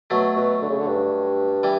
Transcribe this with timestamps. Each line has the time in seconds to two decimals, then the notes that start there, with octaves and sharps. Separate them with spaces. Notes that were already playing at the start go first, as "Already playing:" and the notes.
0.10 B2 F#3 A3
0.36 B2
0.62 D3
0.69 C#3
0.79 D3
0.88 G2
1.63 E3 G3